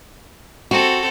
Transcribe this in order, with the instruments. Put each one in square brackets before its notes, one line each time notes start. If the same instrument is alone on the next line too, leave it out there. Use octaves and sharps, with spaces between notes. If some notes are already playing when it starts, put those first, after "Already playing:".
[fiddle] C4 A4 [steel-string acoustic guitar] F#4